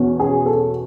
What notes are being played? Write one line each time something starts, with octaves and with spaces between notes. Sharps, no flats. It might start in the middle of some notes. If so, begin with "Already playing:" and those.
Already playing: E2 B2 C#4
G#4
A4